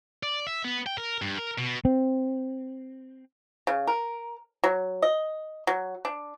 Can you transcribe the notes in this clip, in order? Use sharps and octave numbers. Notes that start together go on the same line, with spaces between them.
D5
E5
B3
G5
A#4
G2
A#4
B2
C4
C#3
A#4
F#3
D#5
F#3
D4